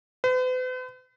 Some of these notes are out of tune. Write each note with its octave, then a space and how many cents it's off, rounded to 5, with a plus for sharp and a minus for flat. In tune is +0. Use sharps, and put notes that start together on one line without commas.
B4 +45